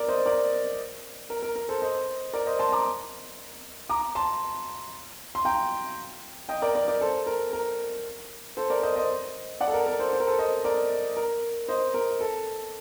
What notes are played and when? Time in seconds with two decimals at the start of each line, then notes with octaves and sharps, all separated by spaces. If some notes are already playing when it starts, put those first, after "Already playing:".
Already playing: A#4 D5
0.08 C5 D#5
0.26 A#4 D5
1.30 A#4
1.43 A#4
1.56 A#4
1.69 A4 C5
1.82 C5 D#5
2.33 A#4 D5
2.46 C5 D#5
2.59 A5 C6
2.72 A#5 D6
3.89 A#5 D6
4.15 A5 C6
5.35 C6
5.45 G5 A#5
6.49 D#5 G5
6.62 A#4 D5
6.75 A#4 D5
6.88 A#4 D5
7.01 A4 C5
7.26 A#4
7.53 A#4
8.57 A4 C5
8.70 A#4 D5
8.83 C5 D#5
8.96 C5 D#5
9.61 D5 F#5
9.68 A4
9.74 A#4
9.86 A#4
9.99 A4 C5
10.13 C5
10.20 A#4
10.28 A4 C5
10.39 C5 D#5
10.64 A#4 D5
11.17 A#4
11.68 C5 D#5
11.94 A#4
12.21 A4